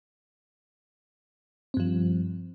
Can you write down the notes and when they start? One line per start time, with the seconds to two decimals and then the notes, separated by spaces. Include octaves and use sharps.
1.74 C4
1.77 G2
1.80 F3